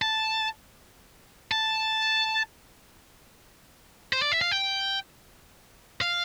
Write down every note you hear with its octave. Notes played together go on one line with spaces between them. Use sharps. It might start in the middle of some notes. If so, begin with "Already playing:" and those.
A5
A5
C5
D5
E5
F5
G5
F5